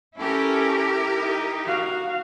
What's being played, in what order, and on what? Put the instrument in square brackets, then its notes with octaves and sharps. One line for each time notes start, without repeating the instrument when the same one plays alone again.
[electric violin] C#4 A4 [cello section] E4 G4 A#4
[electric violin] D#4
[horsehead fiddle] F#4 F5